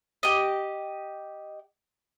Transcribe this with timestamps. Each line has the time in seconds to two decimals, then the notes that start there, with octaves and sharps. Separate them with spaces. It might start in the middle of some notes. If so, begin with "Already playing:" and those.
0.23 G4 D#5